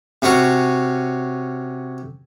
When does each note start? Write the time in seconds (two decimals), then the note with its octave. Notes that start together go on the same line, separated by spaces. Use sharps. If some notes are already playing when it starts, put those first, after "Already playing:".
0.22 C3 C#4 F#4 C#6